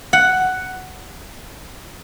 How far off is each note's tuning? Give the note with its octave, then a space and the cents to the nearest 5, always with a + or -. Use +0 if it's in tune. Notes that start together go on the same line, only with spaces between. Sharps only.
F#5 +5